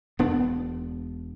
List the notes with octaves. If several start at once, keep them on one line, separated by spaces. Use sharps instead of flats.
E1 B3 D4